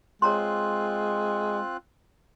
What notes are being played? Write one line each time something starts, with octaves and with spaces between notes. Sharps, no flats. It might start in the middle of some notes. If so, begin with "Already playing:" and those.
G#3 C4 F4 C#5 A#5 C6 F#6